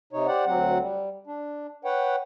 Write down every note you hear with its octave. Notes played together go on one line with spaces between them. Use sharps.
C3 D#4 C#5
G4 C5 D5 F#5
D2 F#3 C4 F#5
G3
D4
B4 C#5 F#5 G5